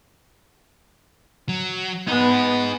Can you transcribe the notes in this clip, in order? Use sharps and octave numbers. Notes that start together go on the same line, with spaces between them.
F#3
B3 D#4 G#4